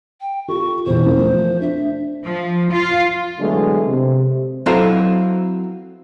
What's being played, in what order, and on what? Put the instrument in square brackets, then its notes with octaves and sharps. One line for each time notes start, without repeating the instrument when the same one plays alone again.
[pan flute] G5
[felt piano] F4 G4 A4 [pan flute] C#6
[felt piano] E1 E2 [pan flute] C5
[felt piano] F3 A#3 C#4
F3 A3
[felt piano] D4 [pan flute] E5
[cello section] F3
F4
[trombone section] D3 E3 F#3 G#3 A3 B3
C3
[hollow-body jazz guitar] F#3 C4 E4 A4 B4 F5